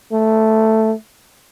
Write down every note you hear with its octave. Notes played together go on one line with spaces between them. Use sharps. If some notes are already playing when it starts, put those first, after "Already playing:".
A3